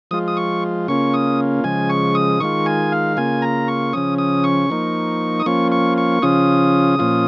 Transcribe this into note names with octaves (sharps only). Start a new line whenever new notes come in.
F3 G#3 F4 D#6
D#6
C#6
C#3 A#3 C#4 F4 C#6
D#6
C#3 F3 G#3 G#5
C#6
D#6
D#3 G#3 F4 C#6
G#5
F5
C#3 A#3 F4 G#5
A#5
C#6
C#3 F3 C#4 D#6
D#6
C#6
F3 A#3 D#4
D#6
F3 A#3 C#4 F4 C#6
C#6
C#6
C#3 F3 C#4 F4 D#6
A#2 F3 C#4 F4